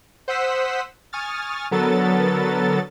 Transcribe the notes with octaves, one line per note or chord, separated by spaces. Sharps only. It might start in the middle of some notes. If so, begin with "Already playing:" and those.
C5 F#5 D#6 E6 B6
G#5 C#6 D#6 F6 A6
D3 F#3 B3 A4 A#4 A6